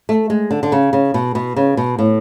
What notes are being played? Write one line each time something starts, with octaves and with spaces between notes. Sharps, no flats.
A3
G#3
D3
D3
C#3
C#3
B2
B2
C#3
B2
A2